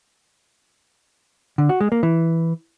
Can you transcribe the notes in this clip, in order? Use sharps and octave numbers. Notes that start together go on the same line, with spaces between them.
D3
F#4
G#3
A#3
E3